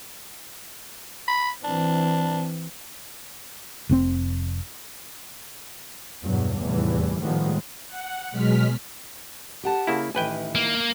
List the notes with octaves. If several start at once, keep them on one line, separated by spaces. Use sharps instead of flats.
B5
E3 C4 D4
F1 A#2 C4
E2 G2 B2 F#3
F1 E2 A2 E3 G3
A2 D#3 F3 G3 G#3 B3
F#5
B2 F#3 G#3 F6 B6
G4 F#5 A5
C#3 A#3 E4
A1 D#3 E4 B4 G5 G#5
A#3